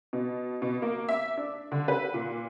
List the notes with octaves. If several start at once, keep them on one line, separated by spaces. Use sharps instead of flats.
B2
B2
A#3
E5
D4
D3
B4
A#2